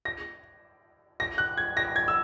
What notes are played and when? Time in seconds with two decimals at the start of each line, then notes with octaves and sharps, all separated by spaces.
0.05 A#6
1.20 A#6
1.38 F#6
1.57 G#6
1.77 A#6
1.96 G#6
2.08 E6